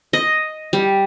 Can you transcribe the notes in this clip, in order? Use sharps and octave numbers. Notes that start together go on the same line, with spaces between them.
D#5
G3